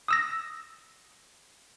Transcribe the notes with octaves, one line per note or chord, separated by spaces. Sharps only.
D#6 E6 A#6